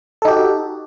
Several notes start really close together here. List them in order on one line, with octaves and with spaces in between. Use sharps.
A4 D#4 G4 F#4